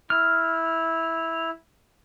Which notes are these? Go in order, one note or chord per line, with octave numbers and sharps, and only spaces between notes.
E4 F6